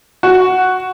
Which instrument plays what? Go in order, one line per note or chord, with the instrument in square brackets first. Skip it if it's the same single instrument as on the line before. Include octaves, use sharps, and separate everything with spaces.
[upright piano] F#4